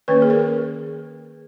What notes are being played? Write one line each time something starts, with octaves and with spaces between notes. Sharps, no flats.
D#3 A#3 C#4 B4
G#4
A#4